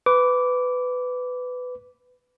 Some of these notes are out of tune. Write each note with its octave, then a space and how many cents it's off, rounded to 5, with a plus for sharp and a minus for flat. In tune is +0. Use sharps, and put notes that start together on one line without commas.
B4 +15 D6 -15